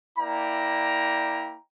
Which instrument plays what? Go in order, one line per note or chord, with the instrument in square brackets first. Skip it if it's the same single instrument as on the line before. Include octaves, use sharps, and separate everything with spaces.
[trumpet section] A#3 E4 D5 G5 A#5